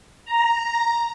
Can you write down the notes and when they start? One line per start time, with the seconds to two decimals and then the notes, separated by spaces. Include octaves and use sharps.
0.25 A#5